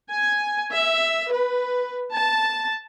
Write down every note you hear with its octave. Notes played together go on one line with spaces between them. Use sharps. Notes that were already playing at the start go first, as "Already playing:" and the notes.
G#5
E5
B4
A5